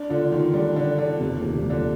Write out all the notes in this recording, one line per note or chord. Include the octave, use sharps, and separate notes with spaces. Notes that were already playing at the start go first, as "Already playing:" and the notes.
Already playing: D4
D3 F4
D3
D#3 F4
D3 G3
D3 D4
D3 F4
F1 C3
A#2
D#2
C3
F3
D3